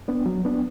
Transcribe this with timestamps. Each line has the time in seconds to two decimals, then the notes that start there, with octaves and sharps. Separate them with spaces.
0.08 B3 D4
0.26 F#3
0.45 B3 D4